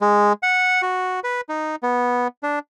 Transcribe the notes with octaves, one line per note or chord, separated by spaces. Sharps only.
G#3
F#5
F#4
B4
D#4
B3
D4